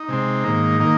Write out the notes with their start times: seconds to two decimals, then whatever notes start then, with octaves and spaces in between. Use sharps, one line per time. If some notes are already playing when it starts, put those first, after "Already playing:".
Already playing: D#4
0.09 C3 G#3 C4
0.44 G#2 D#3 A#3
0.80 D#3 A#3